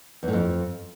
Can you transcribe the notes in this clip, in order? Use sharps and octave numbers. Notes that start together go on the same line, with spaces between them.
E2
A2
F2